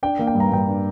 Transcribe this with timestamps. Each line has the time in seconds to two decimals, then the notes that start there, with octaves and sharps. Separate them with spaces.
0.03 D4 G5
0.19 A#3
0.27 G5
0.35 G2
0.40 A#5
0.52 G2 G5
0.68 D4